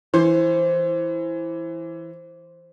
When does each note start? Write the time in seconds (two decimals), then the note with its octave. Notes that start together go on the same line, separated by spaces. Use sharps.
0.14 E3 C5